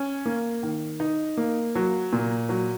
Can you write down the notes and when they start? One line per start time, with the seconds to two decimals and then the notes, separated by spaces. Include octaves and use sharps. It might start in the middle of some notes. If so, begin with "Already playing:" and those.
Already playing: C#4
0.26 A#3
0.63 D#3
1.00 D#4
1.37 A#3
1.75 F#3
2.13 A#2
2.49 F#3